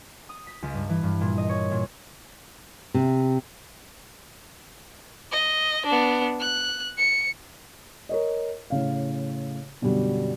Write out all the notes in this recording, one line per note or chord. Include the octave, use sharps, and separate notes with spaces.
D#6
B6
C#2
G2
E3
G2
A#2
D#5
C#5
A#2
C3
D#5
B3 D4
F#6
C#7
A#4 C#5 D#5
A2 C#3 F5
F#2 B2 D3 G3